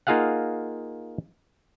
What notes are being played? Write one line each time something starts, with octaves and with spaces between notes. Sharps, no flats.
A#3 D#4 F4 G#4 F5 F#5